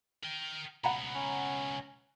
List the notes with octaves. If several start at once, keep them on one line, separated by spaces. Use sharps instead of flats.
A#4 G5
C#2 B2 F#5 A#5 B5
C#4